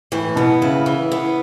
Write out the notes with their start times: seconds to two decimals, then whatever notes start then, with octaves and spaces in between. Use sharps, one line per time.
0.12 A2 E3
0.36 B2 B3
0.62 C#3 E4
0.86 E3
1.12 B3